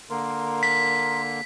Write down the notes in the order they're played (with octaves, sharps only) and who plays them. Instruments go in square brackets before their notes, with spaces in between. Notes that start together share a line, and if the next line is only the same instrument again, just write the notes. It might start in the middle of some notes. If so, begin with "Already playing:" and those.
[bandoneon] D3 A#3 [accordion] A#4 C6
[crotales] B6